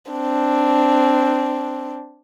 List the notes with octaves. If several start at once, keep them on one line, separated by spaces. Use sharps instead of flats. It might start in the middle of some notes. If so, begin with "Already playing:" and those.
C4 D4